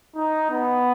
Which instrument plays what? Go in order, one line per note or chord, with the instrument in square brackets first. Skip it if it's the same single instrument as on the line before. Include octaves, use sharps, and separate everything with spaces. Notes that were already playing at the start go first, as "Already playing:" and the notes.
[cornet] D#4
B3